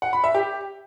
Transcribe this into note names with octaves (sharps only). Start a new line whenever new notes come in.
F#5
B5
E5
G4